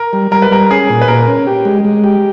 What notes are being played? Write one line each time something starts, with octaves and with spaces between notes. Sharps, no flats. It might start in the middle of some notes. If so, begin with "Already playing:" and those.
Already playing: A#4
G3
G3 A#4
B4
G3 A#4
C#4 G#4
A#2
B4
A#2 A#4
C#4
G4
G#3
G#3
G4